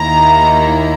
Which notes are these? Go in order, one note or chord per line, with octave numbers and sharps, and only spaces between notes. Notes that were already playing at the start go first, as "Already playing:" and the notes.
Already playing: D#2 D#3 A#3 E4 A#5
A#5